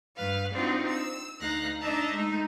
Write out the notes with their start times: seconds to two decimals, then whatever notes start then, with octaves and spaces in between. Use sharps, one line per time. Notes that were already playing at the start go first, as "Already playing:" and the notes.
0.16 G2 B4 F5
0.52 C4 D4 D#4 F4 F#4
0.89 E6
1.40 D2 D#4 F5 F#6 A#6
1.80 D4 D#4 D#5 E5 A5 A#5
2.12 G#3 A3 D#4